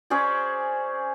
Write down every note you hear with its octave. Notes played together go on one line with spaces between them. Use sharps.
C#4 G#4 C5 D5